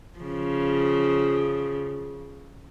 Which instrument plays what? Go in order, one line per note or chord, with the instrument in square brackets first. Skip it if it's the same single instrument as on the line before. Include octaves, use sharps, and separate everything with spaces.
[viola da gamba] C#3 F3